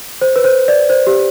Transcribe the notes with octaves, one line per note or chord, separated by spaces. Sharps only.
C5
B4
C5
D5
C5
G4